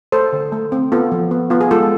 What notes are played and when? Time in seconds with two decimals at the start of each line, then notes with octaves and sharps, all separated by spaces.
0.12 A3 A4 C5
0.33 D3
0.52 A3
0.72 C4
0.92 B3 F4 A4
1.12 F3
1.31 B3
1.50 B3 F4
1.61 G#4
1.71 G#3 F4 A4